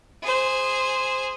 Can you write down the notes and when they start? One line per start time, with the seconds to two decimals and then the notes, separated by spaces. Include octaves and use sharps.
0.22 G#4 C5